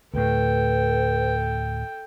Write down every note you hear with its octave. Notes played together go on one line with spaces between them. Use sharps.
D2 A2 A4 B4 G5